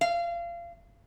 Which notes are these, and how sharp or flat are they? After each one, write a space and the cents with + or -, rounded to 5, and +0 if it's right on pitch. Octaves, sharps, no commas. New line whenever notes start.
F5 -25